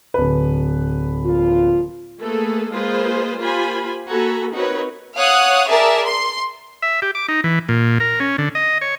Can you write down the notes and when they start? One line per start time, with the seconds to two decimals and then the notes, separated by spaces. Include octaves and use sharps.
0.14 D1 B4
1.24 A#2 F3 F4
2.22 A3 A#3 G#4 A4 B4
2.72 G#3 A#3 F4 G#4 B4 C5
3.39 A#3 F4 G4 C5 G#5 B5
4.09 A#3 F#4 A4 G#5 A#5 B5
4.53 C4 D#4 F#4 A#4 B4 C#5
5.17 C#5 F5 F#5 D#6 F#6
5.69 G#4 A#4 D5 E5 A5
6.04 C6
6.82 E5
7.02 G4
7.15 D6
7.28 D#4
7.44 E3
7.69 A#2
8.00 A#4
8.20 C#4
8.38 D3
8.55 D#5
8.81 C#5